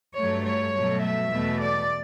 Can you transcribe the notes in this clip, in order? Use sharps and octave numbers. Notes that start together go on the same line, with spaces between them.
G2 F#3 A3 C#5
C#5
B2 F#3 A3
E5
E2 B2 A3
D5